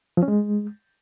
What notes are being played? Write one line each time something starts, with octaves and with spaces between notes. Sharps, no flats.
F3
C#4
G#3